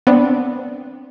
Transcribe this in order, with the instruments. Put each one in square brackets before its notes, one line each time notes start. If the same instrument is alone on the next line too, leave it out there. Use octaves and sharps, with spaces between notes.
[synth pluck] B3 C4 D4